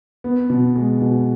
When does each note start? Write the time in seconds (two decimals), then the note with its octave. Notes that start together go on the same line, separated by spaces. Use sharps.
0.24 B3
0.50 B2
0.76 G#3
1.01 B2